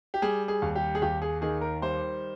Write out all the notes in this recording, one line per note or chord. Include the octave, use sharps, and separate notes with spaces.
G4
G3 G#4
G#4
D#2
G4
G#4
D#2 G4
G#4
D#3 G#4
A#4
G3 C5